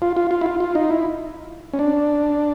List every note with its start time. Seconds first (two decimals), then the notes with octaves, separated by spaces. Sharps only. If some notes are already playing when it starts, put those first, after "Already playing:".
0.02 F4
0.16 F4
0.31 F4
0.41 E4
0.46 F4
0.60 F4
0.75 D#4
0.90 E4
1.73 C#4
1.79 D4